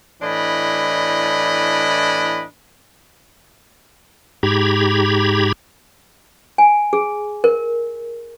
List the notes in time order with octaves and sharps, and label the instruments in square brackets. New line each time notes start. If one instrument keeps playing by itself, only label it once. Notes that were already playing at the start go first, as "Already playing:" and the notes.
[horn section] A2 E3 D4 D#5 B5
[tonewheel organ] G#2 G4 A#5 B5 G#6
[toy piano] G#5
G#4
A#4